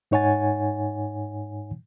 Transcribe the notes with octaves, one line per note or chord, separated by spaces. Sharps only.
G#2 D#4 C#5 F#5 G#5 A6